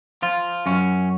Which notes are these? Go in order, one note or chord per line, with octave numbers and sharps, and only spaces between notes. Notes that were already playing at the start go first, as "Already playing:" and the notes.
F3 F4
F#2 C#4